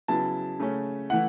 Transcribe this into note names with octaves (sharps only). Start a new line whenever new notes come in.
C#3 F#3 B3 E4 A5
C#3 A3 C#4
E3 A3 E4 F#5